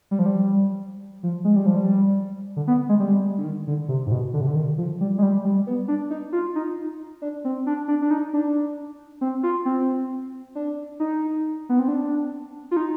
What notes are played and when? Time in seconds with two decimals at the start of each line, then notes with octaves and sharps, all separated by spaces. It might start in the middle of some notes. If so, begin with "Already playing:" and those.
0.11 G3
0.19 F3
0.26 G3
1.23 F3
1.44 G#3
1.56 G3
1.66 F3
1.76 G3
2.56 D3
2.68 B3
2.89 G#3
3.00 G3
3.38 D3
3.44 D#3
3.67 D3
3.88 C3
4.06 G#2
4.12 B2
4.33 D3
4.41 C3
4.47 D3
4.55 D#3
4.78 F3
5.01 G3
5.18 G#3
5.23 G3
5.45 G3
5.67 B3
5.88 D4
6.10 D#4
6.33 F4
6.55 D#4
7.22 D4
7.45 C4
7.67 D4
7.88 D4
8.02 D4
8.11 D#4
8.33 D4
9.21 C4
9.43 F4
9.65 C4
10.55 D4
11.00 D#4
11.69 B3
11.79 C4
11.88 D4
12.71 F4
12.77 D#4